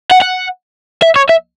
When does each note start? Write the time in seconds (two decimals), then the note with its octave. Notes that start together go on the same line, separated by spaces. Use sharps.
0.11 F#5
0.22 F#5
1.02 E5
1.16 C#5
1.29 E5